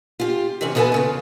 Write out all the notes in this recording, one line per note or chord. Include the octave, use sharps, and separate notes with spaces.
F4 G4
C3 E3 C4 C#4
D#2 B3 F#4 A4 B4 G#5
E2 C#3 F4